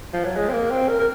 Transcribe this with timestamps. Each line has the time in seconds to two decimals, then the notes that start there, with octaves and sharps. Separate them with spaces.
0.13 F3
0.24 F#3
0.36 G#3
0.49 C4
0.53 A#3
0.71 C4
0.89 A#4
0.99 A#4